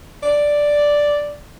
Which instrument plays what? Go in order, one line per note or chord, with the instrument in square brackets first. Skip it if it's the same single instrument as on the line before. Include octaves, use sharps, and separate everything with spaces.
[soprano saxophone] D5